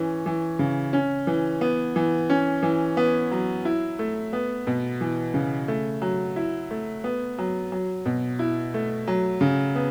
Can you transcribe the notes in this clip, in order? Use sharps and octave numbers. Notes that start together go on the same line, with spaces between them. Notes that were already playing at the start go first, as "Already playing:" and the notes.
Already playing: E3 C#4
E3
C#3
C#4
E3
B3
E3
C#4
E3
B3
F#3
E4
A3
B3
B2
E3
C#3
A3
F#3
E4
A3
B3
F#3
F#3
B2
E4
A3
F#3
C#3
B3